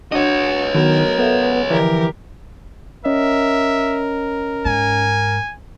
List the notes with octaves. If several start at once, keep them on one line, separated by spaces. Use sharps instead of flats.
D4 F#4 C#5 D#5
D#3 F#3 B3 F#4 A#4
B3 A4 E5 F5
D3 E3 F3 G4 A#4
C#4 A#4 C#5 D#5 E5
G#2 G#5